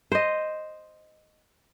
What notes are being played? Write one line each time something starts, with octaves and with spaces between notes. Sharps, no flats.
C5 D#5